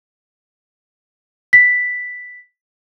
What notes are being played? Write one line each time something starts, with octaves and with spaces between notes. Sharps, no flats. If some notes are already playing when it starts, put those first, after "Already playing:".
B6